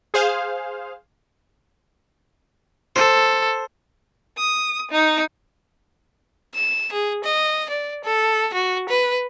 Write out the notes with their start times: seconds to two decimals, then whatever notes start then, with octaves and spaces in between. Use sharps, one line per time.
0.14 G#4 C5 F5
2.96 A4 C5
4.38 D#6
4.92 D#4
6.55 E7
6.92 G#4
7.24 D#5
7.70 D5
8.04 A4
8.54 F#4
8.89 B4